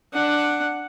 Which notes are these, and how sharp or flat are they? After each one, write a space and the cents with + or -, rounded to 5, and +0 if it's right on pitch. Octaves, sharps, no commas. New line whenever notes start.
D4 +10 F#5 +0